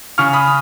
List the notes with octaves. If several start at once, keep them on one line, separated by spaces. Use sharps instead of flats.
C#3 C#6 F6
B5 D#6